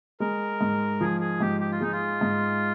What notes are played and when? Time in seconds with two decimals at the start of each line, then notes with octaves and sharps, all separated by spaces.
0.20 G#3 A#4
0.61 G#2
1.01 F3 G#4
1.21 G#4
1.40 G#2 G4
1.60 G4
1.72 F4
1.81 G#3 D#4
1.92 F4
2.21 G#2